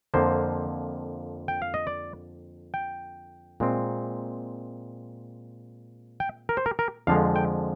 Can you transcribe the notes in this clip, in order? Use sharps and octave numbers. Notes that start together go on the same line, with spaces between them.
F2 D3 F3 A#3 C5
G5
F5
D#5
D5
G5
A#2 G#3 C4
G5
A#4
C5
A#4
A#4
F2 D3 F3 G#3 F5
G5